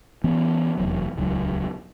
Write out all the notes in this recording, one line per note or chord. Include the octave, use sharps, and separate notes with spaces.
E3 B3 C#4
F1 E2 F#3
D#1 C#2 F#3